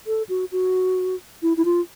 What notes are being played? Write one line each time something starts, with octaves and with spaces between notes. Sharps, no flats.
A4
F#4
F#4
E4
E4
F4